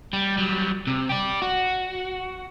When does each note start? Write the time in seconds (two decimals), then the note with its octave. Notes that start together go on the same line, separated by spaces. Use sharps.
0.13 G3
0.38 F#3 G3
0.87 C3
1.09 G4 D5
1.42 F#4